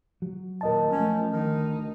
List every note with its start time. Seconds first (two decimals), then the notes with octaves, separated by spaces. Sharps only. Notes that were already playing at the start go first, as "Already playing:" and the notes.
0.22 F#3
0.61 D#2 A#2 A#4 D#5 A5
0.91 F3 A3 C#4
1.32 D2 D#3 D#4